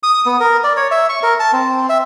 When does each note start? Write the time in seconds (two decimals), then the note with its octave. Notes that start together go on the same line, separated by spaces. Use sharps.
0.03 D#6
0.26 B3
0.40 A#4
0.64 D5
0.77 C#5
0.91 E5
1.09 C#6
1.23 A#4
1.40 A5
1.53 C4
1.89 E5